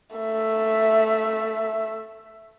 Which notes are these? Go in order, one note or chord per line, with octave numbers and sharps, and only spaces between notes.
A3 E5